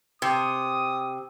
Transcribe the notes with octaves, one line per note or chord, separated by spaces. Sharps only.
C3 D#6